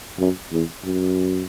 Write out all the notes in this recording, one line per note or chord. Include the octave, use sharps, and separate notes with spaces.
F#2
E2
F#2